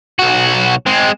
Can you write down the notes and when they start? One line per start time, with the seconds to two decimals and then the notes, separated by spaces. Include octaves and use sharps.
0.19 B1 F#4
0.87 G#3 C4